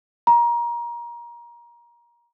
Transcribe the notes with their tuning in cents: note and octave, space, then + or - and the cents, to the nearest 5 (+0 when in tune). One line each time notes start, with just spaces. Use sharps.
A#5 +25